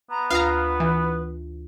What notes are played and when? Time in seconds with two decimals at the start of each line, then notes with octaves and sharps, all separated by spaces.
0.10 B3 A#5
0.30 D2 F4 B4 F5 A#5 D#6
0.80 E3